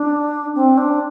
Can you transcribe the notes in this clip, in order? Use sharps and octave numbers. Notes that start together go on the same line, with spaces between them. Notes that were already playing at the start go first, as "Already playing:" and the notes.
Already playing: D4
C4
D4